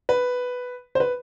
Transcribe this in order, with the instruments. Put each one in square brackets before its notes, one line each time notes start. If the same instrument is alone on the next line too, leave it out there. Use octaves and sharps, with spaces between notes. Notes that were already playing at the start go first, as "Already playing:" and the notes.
[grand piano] B4
C5
B4